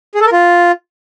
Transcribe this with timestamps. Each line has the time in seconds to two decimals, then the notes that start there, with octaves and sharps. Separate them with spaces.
0.15 G#4
0.20 A4
0.26 A#4
0.32 F4